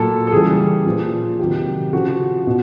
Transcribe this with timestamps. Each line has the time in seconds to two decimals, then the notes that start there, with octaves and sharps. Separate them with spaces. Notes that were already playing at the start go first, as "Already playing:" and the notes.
Already playing: A#2 F#3 A4
0.27 A4
0.32 C#3 E3 G3 G#4
0.86 A#2 F3
1.39 C3 D#3 F#3 G4
1.93 C#3 F3 F#4
2.47 B2